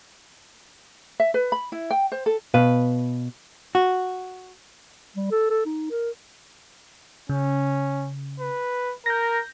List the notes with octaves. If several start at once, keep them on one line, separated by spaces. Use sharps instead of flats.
E5
B4
B5
E4
G5
C5
A4
B2 B4 F5
F#4
G3
A4
A4
D#4
A#4
C#3 C#4
B4
A#4 G6 A#6